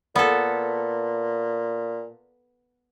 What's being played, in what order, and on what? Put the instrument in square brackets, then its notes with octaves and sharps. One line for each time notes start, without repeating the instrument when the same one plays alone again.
[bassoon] A#2 [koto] B3 A4